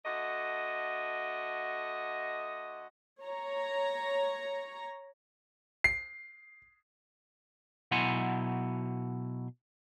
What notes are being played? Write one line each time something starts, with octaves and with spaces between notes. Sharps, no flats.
D3 A3 F#4 D#5
C#5 A#5
C7
B2 F#3 E4 F#5 G#5 C6